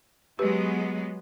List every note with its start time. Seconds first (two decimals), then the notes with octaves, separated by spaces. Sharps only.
0.39 F#3 G#3 B3 G4 B4